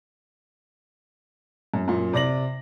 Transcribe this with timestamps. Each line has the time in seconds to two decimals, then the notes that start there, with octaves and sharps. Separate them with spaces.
1.74 F#2
1.88 F#2 A#2
2.13 C3 D5 A#6 F#7